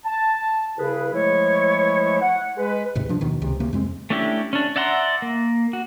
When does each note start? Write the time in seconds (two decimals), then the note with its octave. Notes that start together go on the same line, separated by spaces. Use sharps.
0.04 A5
0.78 C2 C#3 E4 G#4 B4
1.13 E3 F3 G#3 A3 E4 C#5
2.21 F#5
2.57 G#3 B4
2.95 D2 G#2 C3
3.09 F3 D4
3.21 D#2 B2 D#3
3.42 C#2 C3
3.60 D2 C3 A#3
3.73 F2 G#3 C4
4.10 A3 C#4 D4 E4 G4
4.53 C#4 D4
4.76 D5 E5 F#5 A#5 C6
5.22 A#3
5.73 F#4